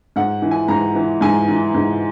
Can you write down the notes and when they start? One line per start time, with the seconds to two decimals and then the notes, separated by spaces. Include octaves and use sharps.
0.16 G#2 F#5
0.42 E3
0.51 G#5
0.68 G#2 A#5
0.95 E3
1.21 G#2 G#5
1.48 E3
1.75 G#2